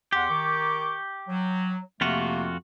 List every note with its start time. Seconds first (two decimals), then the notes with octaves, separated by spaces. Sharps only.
0.13 E2 G4 F#5 C6
0.29 D#3 C#6 D6
1.28 F#3
2.01 F2 C3 A3 A#3 F4 F#4